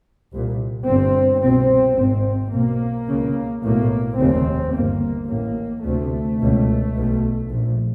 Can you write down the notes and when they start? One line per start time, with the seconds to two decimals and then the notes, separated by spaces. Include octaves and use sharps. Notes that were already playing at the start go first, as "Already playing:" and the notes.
0.33 C2 A#2
0.87 G1 G2 C4
1.42 C2 B2 C4
1.98 G#1 G#2 C4
2.54 B1 B2 A#3
3.08 C#3
3.13 C#2
3.63 B1 A2 A#3
4.19 F1 D#2 C#3 C4
4.74 G1 G2 A#3
5.29 A1 A2 A#3
5.84 D2 C3 A3
6.40 C#2 B2
6.95 B1 B2
7.50 A#1 A#2